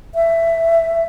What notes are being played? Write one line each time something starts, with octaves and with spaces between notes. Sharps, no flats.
E5